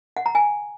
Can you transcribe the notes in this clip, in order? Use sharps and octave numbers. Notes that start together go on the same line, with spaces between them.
F#5
A#5
G#5